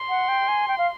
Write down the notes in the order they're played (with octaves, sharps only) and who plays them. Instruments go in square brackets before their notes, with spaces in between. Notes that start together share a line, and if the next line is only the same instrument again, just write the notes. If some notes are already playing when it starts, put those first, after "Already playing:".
Already playing: [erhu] C6
[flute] F#5
G5
G#5
G5
F5